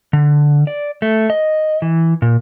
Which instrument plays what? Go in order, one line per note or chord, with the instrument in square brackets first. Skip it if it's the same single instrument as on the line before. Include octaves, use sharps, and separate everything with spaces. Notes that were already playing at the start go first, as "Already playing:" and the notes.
[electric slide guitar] D3
D5
A3
D#5
E3
A#2